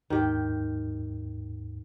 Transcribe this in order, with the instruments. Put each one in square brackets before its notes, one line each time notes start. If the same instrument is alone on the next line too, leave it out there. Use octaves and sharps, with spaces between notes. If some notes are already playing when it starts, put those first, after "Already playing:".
[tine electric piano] D#2 G#2 [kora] D#3 G4